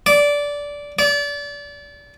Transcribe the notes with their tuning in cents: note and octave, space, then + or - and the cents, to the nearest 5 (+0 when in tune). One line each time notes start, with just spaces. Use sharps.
D5 -15
D5 -30